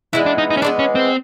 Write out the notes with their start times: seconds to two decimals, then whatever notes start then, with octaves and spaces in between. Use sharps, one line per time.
0.13 E3 G#3 B3 E4
0.26 D4
0.38 D#4
0.50 D#4
0.57 C#4
0.62 E3 G#3 B3 D4
0.79 C#4
0.95 C4